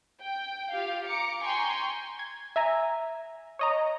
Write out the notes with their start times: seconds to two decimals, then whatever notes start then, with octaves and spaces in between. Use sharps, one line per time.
0.22 G5
0.71 F4 G4 F5
1.06 A#5 D6 C#7
1.42 G5 G#5 A#5 C6 C#6
2.19 G#6
2.56 E5 G#5 A#5
3.59 C#5 D#5 A#5